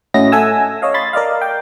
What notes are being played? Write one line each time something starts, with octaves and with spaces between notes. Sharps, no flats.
A2 C#4 E4 F#4 D#5 A#6
A4 E5 F#5 G#5 E6
C#5 D#5 F5
B5 C6 A6
A#4 D5 D#5 F5
G5